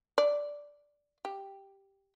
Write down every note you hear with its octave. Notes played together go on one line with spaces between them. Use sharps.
D5
G4